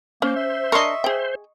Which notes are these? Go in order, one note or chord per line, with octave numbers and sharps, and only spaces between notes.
A#3 C#4 C5
E5
D4 A#4 D#5 C6 C#6
G#4 C5 G5